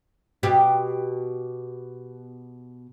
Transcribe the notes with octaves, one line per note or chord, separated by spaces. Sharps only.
B2 G4